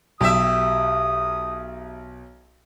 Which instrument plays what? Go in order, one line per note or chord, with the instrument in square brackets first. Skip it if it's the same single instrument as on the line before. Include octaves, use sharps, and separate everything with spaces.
[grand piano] B1 [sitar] G4 E5 [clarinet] D#6